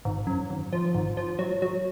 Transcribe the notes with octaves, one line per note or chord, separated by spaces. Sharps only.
G#1
F#2
G#1
F3
G#1
F3
F#3
F#3